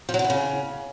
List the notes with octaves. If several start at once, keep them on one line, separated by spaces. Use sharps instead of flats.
F3
F#3
D3
E3
C#3